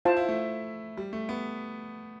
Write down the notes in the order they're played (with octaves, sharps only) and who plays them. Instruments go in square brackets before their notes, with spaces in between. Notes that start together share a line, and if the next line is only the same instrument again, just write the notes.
[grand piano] E4 [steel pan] F4 C5 F5 A5
[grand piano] E4
A3
G3
A3
B3